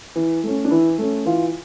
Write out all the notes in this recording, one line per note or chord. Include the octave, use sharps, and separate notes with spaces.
E3
A3 C#4
D4
E3 E4
A3 C#4
E3 F4